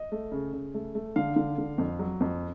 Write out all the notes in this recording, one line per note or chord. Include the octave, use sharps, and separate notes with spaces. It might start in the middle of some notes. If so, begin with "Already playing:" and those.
Already playing: D#5
A3
C#3
C#3
A3
A3
D3 F5
D3
D3
F2
F#3
F2